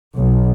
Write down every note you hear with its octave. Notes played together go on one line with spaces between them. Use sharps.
B1